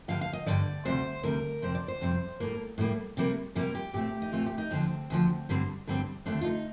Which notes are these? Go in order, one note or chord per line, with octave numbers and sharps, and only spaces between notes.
G2 D3 G3 F5
F5
D#5
G2 D3 G3 D5
D2 C3 G3 C5
D2 C3 G3 A#4
F2 C3 G3 C4 C5
D5
C5
F2 C3 G3 C4
A2 G3 A#3 A#4
A2 G3 A#3
C3 G3 A#3
C3 G3 A#3 A#4
G4
A#2 A3 C4 G4
D#4
A#2 A3 C4 F4
G4
D#4
D2 D3 F3 C4
D2 D3 F3
G2 D3 G3 C4
G2 D3 G3 C4
D#2 D3 A3 C4 D4
F4
D#4